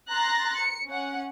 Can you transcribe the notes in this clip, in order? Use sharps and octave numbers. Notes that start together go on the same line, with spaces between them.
A#5 C6 F#6 A6 A#6
C#7
C#4 F#5